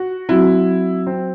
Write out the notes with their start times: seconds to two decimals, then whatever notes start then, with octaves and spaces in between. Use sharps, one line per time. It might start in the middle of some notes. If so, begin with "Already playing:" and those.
Already playing: F#4
0.29 F#3 C4 E4 F#4
1.07 C4